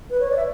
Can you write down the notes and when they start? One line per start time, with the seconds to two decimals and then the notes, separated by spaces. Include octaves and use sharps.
0.10 B4
0.20 C#5
0.31 D5
0.37 E5